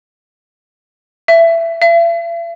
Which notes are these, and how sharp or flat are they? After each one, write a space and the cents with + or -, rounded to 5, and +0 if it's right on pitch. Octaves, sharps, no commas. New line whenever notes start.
E5 +20
E5 +45